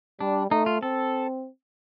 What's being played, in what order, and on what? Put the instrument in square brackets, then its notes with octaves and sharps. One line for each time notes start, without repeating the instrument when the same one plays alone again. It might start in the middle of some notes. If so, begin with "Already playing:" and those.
[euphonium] G3 [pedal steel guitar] D4
[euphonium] A3 [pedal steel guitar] D#4
[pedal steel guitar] F4
[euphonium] C4 [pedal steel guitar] A4